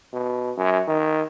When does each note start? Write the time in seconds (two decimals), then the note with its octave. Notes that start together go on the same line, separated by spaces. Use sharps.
0.13 B2
0.57 F#2
0.88 D#3